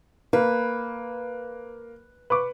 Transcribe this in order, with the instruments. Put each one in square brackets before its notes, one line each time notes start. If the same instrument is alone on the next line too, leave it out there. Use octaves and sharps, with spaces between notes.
[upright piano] A#3 [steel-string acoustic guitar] B4
[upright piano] B4 C#6 D6